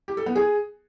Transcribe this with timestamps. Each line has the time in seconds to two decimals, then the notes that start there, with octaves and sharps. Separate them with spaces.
0.08 G4
0.17 A4
0.26 B3
0.36 G#4